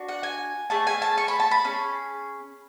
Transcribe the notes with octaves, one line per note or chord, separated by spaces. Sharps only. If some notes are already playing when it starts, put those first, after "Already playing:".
Already playing: D4 F#4
F#5
G#5
A3 C#4 G#4 A5
G#5
A5
C#6
B5
A5
B5
C#4 G#4